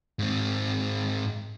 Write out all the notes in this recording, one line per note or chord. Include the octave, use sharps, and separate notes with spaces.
G#2 C4